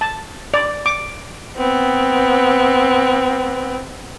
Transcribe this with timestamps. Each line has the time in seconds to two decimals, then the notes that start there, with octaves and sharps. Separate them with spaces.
0.01 A5
0.54 D5
0.86 D6
1.57 B3 C4